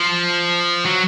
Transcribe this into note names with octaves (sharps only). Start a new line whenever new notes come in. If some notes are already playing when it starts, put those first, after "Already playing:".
Already playing: F3
F#3